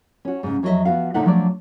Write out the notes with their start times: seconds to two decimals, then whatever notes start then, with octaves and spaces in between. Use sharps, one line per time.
0.25 C#4 F#4
0.43 G#2 C#3
0.63 F2 F#3 E4 D#5 E5
0.85 F3 B3 F#4 F5
1.14 A#2 D3 D#4 A4 E5 F#5
1.26 F3 F#3 A3 D4 D5